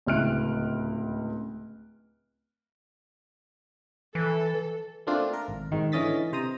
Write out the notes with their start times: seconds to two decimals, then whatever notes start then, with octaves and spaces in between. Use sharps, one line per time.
0.06 D1 C#2 E4 F6 F#6 D7
4.15 E3 A4
5.07 A3 A#3 C4 D4 F4
5.33 A#4
5.48 G#1
5.72 G#2 D#3
5.92 D3 E3 C#4 D#5 A6 B6
6.32 C3 C5 A#5 D#6